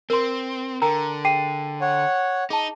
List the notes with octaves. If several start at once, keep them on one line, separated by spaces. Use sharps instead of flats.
C4 A#4 C6
D3 A#4 G5 A#5
G#4 G5 C7 D#7
C#5 F#5
D#4 G#4 A5